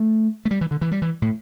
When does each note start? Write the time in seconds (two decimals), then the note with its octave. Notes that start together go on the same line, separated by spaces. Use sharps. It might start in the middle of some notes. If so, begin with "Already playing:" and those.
Already playing: A3
0.45 A3
0.51 G3
0.61 E3
0.71 D3
0.81 E3
0.91 G3
1.02 E3
1.22 A2